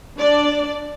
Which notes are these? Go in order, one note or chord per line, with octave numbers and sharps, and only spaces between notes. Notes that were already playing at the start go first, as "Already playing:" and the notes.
D4 D5